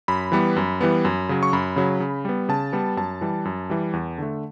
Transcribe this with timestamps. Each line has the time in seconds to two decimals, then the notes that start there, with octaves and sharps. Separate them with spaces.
0.08 F#2 B5
0.32 E3 G3 B3
0.56 F#2
0.81 E3 G3 B3
1.05 F#2
1.29 C#3 F#3
1.43 C#6
1.53 F#2 B5
1.76 C#3 F#3
2.00 C#3
2.25 G3 B3
2.49 C#3 A5
2.73 G3 B3
2.97 F#2 A5
3.21 E3 G3
3.45 F#2
3.70 E3 G3
3.93 E2
4.18 D3 A3